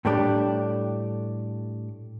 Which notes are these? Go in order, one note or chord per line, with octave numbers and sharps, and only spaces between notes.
A2 G3 A3 D4 G4